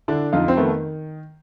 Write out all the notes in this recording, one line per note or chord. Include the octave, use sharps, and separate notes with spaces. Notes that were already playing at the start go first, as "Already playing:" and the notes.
D3 D4 E4
F2 D#4 F4
C4
D#3 A3 B3